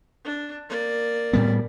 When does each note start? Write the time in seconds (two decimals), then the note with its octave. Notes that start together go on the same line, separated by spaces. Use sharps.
0.25 D4
0.69 A#3 D5
1.33 A2 G3 B3